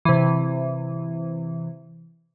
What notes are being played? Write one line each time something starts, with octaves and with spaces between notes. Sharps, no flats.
C3 E3